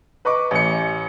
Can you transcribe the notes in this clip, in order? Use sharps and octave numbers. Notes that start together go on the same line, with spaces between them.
B4 D#5 C#6 D6
A1 C#7